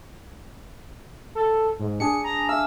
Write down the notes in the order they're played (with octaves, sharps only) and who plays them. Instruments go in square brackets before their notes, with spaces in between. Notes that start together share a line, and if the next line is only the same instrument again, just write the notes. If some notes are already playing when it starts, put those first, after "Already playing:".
[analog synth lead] A4
G#2
[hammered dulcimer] D4 G#4 [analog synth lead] C#7
[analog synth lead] A#5
[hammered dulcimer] E5 F5 [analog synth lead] E6